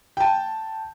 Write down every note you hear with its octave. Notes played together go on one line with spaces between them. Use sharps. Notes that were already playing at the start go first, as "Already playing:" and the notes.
G5 A5